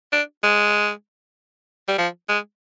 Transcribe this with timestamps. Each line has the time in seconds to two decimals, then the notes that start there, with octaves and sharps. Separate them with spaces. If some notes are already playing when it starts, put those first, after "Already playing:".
0.12 D4
0.43 G#3
1.88 G3
1.98 F3
2.29 G#3